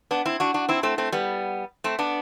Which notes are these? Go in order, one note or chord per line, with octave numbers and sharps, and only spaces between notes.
B3 D4
C4 E4
D4 F#4
D4 F#4
C4 E4
A3 C4
A3 C4
G3 B3
A3 C4
B3 D4